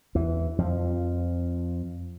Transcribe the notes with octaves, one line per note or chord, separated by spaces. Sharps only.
E2 E3
F2 F3